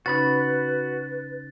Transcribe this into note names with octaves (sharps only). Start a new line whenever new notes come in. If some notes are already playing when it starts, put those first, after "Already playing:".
C#3 C#4 D#4 F#4 B4 B5 A6